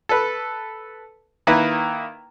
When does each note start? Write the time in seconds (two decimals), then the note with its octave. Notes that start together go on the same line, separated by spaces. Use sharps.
0.09 A4 B4
1.47 D#3 A#3 E4 B4